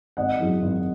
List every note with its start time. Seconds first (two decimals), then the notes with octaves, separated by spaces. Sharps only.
0.17 G#1 D#5 F#5
0.40 F#2 E3 G#3
0.62 G#1